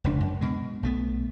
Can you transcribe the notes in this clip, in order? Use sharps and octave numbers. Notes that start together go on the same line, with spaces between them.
F1 C#2 D4
F#2
B2 G#3
B1 A3 B3